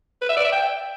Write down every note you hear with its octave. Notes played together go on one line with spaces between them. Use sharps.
B4
E5
D5
E5
G5